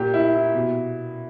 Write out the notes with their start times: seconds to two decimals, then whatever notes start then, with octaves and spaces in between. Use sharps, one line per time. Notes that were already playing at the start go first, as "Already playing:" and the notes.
Already playing: A#2 G4
0.14 E4
0.34 E4
0.55 B2